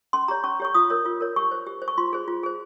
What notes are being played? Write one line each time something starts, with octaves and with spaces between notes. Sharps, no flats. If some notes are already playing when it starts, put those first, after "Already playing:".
C#4 C6
G4 C#5 A#5
C#4 C#6
G4 C#5 C#6
F4 D#6
A#4 C#5
F4
A#4 C#5
G4 C#6
C5
G4
C5
C#6
F4 C6
G#4 C5
F4
G#4 C5